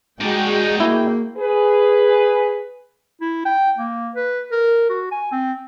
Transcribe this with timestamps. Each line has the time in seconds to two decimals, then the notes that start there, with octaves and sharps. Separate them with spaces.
0.21 G#3 D#4 F#4 G#4 D5 G5
0.80 A#3 E4
1.38 G#4 B4
3.21 E4
3.45 G5
3.78 A#3
4.16 B4
4.51 A#4
4.90 F#4
5.12 G#5
5.32 C4